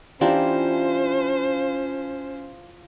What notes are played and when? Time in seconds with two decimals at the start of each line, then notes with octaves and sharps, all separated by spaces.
0.21 E3 C#4 D4 F4 G4 C5 A5 A#5